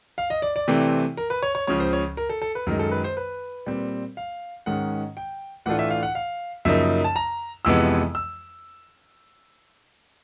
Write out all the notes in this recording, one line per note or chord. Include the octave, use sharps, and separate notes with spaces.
F5
D#5
D5
D5
C3 E3 A3 C4
A#4
B4
C#5
C#5
C#2 C#3 F3 C#5
C5
C#5
A#4
A4
A4
B4
F#2 D#3 G#3 A#4
A4
B4
C5
B4
A#2 G3 C4
F5
G#2 D#3 G#3 C#4 F#5
G5
A2 E3 A3 D4 F4 F#5
E5
F5
F#5
F5
F#2 C#3 F3 A#3 D#4 E5
A5
A#5
F2 C3 E3 G#3 B3 E6
E6